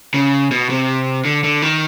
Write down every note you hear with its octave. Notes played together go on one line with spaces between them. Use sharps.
C#3
B2
C3
D3
D3
D#3